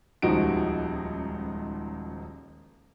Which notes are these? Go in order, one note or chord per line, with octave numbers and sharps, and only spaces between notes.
D#1 C#2 F3 D#4 F#4 D7